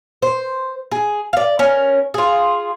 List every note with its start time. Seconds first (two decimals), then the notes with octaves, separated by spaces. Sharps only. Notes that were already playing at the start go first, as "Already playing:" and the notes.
0.22 C5
0.91 G#4
1.33 D5 F5
1.59 C#4 A#4
2.14 F4 G#4